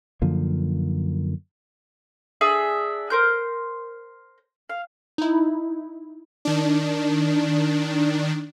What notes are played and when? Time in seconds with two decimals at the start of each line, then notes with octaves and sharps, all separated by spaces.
0.22 F#2 D3 F3 A#3
2.41 D4 G#4 E5
3.10 A#4 C5 G6
4.70 F5
5.18 D#4 E4
6.45 D#3 D4